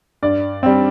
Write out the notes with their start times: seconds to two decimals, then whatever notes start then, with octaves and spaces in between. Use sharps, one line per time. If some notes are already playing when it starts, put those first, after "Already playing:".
0.23 G2 D5
0.63 G3 C4